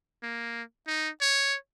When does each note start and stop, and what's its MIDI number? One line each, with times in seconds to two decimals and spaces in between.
0.23 0.62 58
0.87 1.09 63
1.21 1.56 73